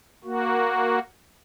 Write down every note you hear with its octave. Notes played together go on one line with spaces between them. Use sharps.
A#3 F#4